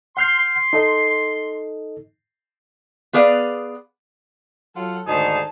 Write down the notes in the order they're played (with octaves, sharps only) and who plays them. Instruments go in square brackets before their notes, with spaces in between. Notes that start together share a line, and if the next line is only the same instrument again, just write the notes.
[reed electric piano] F#5 F6 G6 [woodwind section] C6
[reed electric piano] D#4 A4 D#5
[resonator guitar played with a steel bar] B3 G#4 B4 D5 F5
[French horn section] F#3 [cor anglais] F4 [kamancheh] A4 F#5
[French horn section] D2 F#4 D5 [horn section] G#2 D#3 G#4 [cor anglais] D#4 [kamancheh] A5